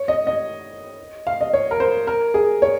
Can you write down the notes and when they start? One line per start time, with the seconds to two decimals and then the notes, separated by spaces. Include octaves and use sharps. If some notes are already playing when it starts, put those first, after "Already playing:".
Already playing: C#5
0.08 D#5
0.27 D#5
1.27 F5
1.41 D#5
1.53 C#5
1.71 A#4
1.80 C5
2.07 A#4
2.34 G#4
2.62 C#5